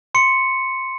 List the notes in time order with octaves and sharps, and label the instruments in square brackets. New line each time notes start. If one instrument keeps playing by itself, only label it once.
[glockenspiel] C6 C#7